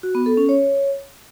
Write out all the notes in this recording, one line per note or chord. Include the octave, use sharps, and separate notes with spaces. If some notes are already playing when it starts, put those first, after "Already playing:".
F#4
B3
A4
C#4
C#5